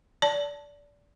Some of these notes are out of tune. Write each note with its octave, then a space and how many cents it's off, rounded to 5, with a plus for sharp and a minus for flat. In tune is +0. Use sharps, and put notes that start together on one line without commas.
D5 -20 A5 +0